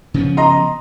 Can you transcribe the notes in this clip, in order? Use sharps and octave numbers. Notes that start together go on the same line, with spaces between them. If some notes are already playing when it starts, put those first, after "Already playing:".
C#3 F3 B3
D#5 A#5 C6